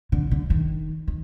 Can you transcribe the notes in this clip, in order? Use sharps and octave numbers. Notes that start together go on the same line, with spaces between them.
D3
D3
D#3
D#3